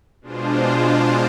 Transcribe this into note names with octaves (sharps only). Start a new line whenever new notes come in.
B2 G#3 D4 F4 C5